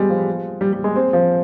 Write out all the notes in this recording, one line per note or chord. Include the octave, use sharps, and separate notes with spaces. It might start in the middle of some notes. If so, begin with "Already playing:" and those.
Already playing: G3 G#3 B3
F3
G3
G3
G#3
C4
F3